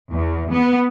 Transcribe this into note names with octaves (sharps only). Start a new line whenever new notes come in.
E2
B3